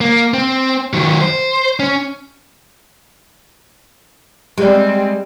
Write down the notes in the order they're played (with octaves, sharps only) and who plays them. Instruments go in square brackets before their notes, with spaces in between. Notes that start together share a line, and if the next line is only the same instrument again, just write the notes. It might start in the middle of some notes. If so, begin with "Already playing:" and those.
[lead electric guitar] A#3
C4
D#3 F#3
C5
C#4
[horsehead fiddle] G3 C4 [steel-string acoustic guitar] G#3 [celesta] G4 D5